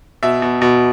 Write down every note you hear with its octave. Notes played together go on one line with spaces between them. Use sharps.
B2 E5
B2
B2